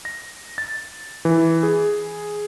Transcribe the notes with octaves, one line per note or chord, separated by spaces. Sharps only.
A#6
A6
E3
G#4